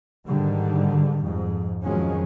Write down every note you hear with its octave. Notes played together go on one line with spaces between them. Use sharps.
G#2 D3 D#3 G3
F2 G#2
F2 D#3 F3 F#3 G#3 C#4